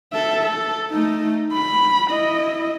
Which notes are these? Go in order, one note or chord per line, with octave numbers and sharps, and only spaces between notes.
A4 E5
A4
A3 D#4
B5
E4 D#5